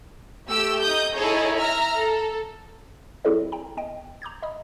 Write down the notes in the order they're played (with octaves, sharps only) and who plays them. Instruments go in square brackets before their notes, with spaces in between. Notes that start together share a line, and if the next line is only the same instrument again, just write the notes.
[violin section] A3 G4 G5 E6
D#4 D#6 G6
D#4 E4 G#4 A4 C#5
E5 A#5 F6
A4
[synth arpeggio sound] F#3 C4 E4 G#4 A4 D5
G5 A#5
B3 D#5 G5
A#5 D6 G6 G#6
D#5 B5 D#6